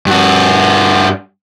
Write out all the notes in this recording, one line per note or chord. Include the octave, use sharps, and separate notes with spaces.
G2 F#4